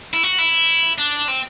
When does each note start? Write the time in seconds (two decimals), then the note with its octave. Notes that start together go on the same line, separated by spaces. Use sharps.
0.13 E4
0.23 F#4
0.38 E4
0.98 D4
1.28 C4